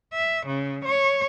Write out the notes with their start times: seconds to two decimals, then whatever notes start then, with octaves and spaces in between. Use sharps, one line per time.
0.13 E5
0.46 C#3
0.85 C#5